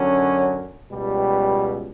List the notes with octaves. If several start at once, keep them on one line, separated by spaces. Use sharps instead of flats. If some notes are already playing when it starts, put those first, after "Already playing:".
Already playing: F#2 D3 F#3 C#4
C#2 B2 G3